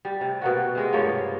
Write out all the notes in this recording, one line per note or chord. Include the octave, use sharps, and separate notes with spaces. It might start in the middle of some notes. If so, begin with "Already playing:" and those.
G3
C3
B2 A#3 F#4
C3 G#3
G2 F3 A#3 C#5